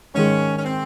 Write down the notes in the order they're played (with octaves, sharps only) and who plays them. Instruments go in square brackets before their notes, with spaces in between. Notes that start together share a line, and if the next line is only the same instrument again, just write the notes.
[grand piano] G#2 D#3 G#3 [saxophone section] C#4
[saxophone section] C#4
C4